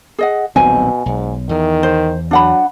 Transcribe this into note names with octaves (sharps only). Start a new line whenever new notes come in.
G#4 D#5 F#5
D#1 B1 B2 C4 G#5
B1 G#2
E2 D#3
C5
F#3 D4 F#5 B5